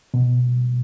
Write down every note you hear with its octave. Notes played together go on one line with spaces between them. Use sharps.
B2